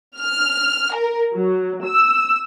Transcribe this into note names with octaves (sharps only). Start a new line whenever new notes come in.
F6
A#4
F#3
E6